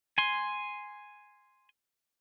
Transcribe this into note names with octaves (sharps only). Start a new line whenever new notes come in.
G#5 C6